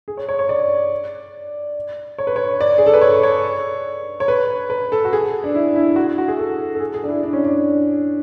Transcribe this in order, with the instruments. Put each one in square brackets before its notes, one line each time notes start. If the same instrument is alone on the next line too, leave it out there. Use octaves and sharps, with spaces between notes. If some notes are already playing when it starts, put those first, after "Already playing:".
[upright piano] G#4
C#5
C#5
C#5
D5
C#5
B4
C#5
D5
G#4
A4
B4
C#5
C#5
C#5
B4
B4
A4
F#4
G#4
D4
E4
E4
F#4
F#4
G#4
A4
A4
G#4
G#4
D4
E4
D4
C#4
D4